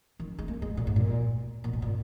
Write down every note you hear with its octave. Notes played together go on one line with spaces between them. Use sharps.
D#3
G#3
A#3
G#3
A#2
G#2
A#2
A#2
B2
A#2